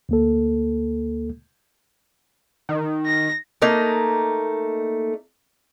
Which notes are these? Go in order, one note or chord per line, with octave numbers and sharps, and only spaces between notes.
D2 A#3 A4
D#3
A#6
A3 A#3 D#4